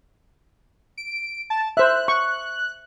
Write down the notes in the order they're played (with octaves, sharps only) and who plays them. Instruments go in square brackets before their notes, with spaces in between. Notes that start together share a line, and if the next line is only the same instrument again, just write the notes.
[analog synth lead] D7
A5
[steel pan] C5 E5 [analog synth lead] F#6
[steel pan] C#6